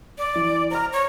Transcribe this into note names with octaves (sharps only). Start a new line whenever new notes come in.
D5
E3
C5 A#5 F6
C#5